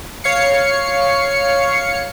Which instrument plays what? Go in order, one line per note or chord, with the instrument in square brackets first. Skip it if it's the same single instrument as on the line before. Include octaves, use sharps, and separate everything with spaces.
[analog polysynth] C#5 F5 C7 C#7